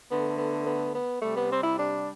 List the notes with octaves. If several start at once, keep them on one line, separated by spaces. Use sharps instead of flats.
D3 A3 B3
B3
B3
B3
C3 G3 A3
B3
C4
E4
D4